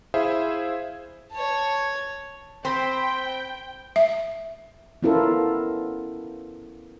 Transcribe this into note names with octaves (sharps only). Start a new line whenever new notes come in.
E4 G#4 C5 E5 F5
C#5 A5
C4 C5 G5 B5
E5
B3 C#4 E4 F4 A4 A#4